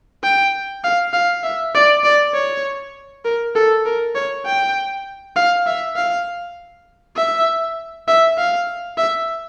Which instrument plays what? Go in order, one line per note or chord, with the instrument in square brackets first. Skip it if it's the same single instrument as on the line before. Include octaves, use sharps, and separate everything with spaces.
[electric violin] G5
F5
F5
E5
D5
D5
C#5
A#4
A4
A#4
C#5
G5
F5
E5
F5
E5
E5
F5
E5